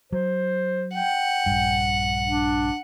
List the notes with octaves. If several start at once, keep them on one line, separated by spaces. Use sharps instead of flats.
F#3 C5
F#5 G5
A#1 G2
D4